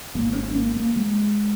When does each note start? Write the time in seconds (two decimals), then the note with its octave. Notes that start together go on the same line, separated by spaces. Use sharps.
0.15 G#1 G#2 A#3
0.32 A#3
0.35 C#4
0.50 C#4
0.55 A#3
0.76 A#3
0.96 G#3